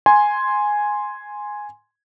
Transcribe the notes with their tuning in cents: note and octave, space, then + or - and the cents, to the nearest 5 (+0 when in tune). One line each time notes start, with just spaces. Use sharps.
G#5 +0 C6 +0